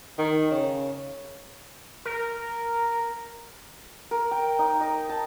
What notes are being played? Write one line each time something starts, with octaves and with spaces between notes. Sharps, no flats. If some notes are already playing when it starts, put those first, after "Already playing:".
D#3
C#3
A#4
A#4
G5
D#4
D#5
A5